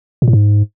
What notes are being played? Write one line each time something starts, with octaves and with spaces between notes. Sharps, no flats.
A#2
A2
G#2